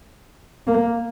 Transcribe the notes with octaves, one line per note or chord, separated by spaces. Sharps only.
A#3